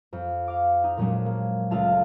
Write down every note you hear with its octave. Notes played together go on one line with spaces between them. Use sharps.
F2
F5 D6
D#4
A#2 F3 F#3 G#3 C#4 D4
A#3
C#2 G#3 A3 F4 F5 A5